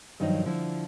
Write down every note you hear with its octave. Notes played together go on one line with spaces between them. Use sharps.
G2 D#3 F3 F#3 D#4
D3 F3 E4